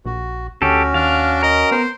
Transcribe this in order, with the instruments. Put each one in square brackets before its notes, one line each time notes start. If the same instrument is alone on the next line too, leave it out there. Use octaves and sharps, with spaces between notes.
[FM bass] A#1 [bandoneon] F#4
[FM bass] D2 [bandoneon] C#4 F#4 [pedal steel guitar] G4 A4
[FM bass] D#2 [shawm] D4 [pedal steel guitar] F5
[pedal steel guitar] A#4 [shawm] D#5
[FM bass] B3 [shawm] C5